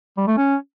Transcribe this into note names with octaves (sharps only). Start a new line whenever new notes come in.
G3
A3
C#4